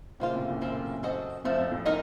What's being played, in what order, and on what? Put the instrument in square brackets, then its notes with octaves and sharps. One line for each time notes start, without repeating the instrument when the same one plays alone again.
[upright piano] A#2 C#3 [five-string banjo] F3 A#3 F4
[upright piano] A2 C3
F#2 A#2
[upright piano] F#2 [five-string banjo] F3 C4 F4 A#4
[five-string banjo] C4 F#4 A4 D#5
[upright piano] F2 [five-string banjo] F3 A3
[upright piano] F2
F2 A2
[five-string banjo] D#4 A#4 D#5